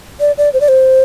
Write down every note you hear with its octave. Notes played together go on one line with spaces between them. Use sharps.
D5
D5
C5
D5
C5